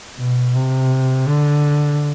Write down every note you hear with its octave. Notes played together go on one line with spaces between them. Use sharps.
B2
C3
D3